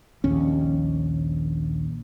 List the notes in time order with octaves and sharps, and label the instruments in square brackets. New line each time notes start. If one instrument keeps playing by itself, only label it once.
[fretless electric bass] A#1 D#2 C#4